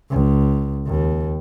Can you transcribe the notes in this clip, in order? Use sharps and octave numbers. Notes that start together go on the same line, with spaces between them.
C#2
D#2